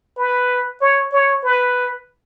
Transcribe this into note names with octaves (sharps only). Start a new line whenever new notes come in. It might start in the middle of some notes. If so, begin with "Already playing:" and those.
B4
C#5
C#5
B4